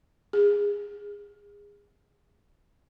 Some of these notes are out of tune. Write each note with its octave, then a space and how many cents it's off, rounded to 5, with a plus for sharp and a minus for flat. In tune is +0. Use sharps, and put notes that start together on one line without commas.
G#4 -25